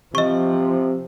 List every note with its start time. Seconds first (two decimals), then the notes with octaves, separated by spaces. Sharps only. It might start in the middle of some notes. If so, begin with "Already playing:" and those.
0.15 C3 F3 D#5 C#6